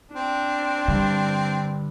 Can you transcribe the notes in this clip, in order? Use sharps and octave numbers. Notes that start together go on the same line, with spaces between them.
C4 D4
G2 D3